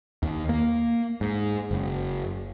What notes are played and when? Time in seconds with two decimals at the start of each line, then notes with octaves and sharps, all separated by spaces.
0.23 D#2
0.49 A#3
1.21 G#2
1.71 F#1